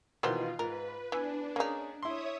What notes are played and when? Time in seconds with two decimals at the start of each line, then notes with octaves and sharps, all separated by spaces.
0.23 B2 D#3 E3 A#3 B3 F4 C5
0.59 G#2 A#4 B4
1.12 E3 B3 D4 G#5
1.56 A#3 C#4 D#4 G#4
2.03 E4 C#5 E5 C6 D#6